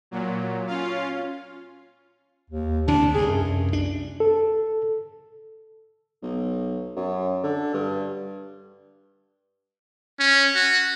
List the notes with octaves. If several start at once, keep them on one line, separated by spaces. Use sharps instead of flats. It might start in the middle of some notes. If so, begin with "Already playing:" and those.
A#2 F#3
C#4 F4 F5
D#2
D2 C3 E3 D4
C2 G2 G#4
F#2
D4
A4
B1
F#2
D3
G2
C#4
F#4